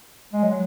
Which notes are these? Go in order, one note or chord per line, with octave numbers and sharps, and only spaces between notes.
G#3
F#3